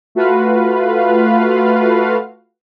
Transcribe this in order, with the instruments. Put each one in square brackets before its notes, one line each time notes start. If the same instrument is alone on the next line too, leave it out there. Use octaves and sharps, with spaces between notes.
[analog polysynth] A3 F4 F#4 B4 F5